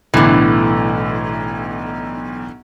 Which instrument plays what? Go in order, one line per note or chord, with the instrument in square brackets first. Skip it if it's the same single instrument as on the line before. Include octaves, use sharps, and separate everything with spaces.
[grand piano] B1 A2 [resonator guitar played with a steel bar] D3 E3